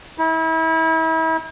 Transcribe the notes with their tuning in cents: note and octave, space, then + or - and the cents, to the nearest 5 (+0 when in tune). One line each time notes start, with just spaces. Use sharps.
E4 -35